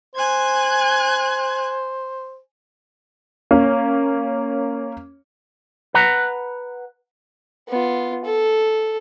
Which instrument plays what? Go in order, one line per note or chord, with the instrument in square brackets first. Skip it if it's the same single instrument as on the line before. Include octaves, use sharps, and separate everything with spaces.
[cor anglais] C5 [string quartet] G#5 F#6 G#6
[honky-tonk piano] A#3 C#4
[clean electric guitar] B4 F#5 A#5
[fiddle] B3 F4
A4